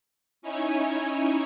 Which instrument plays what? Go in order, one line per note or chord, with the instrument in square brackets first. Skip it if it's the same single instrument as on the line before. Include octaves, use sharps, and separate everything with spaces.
[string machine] C#4 D#4 E4 C#5 G#5